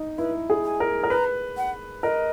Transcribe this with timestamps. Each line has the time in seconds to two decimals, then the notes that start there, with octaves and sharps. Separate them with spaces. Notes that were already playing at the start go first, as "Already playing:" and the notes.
Already playing: D#4
0.18 E4 B4
0.50 G#4
0.65 G#5
0.80 A#4
1.04 A#4
1.10 B4 A#5
1.57 F#5
2.03 A#4 D#5